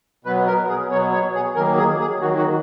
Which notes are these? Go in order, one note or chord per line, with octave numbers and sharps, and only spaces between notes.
B2 F#3 B3 B4
A#4
G#4
B2 F#3 B3 C#5
C#5
G#4
D#3 F#3 A#3 A#4
G#4
G#4
D#3 F#3 A#3 F#4
F#4